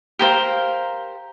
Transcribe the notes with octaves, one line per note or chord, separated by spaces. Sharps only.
G4 A#4 C5 F5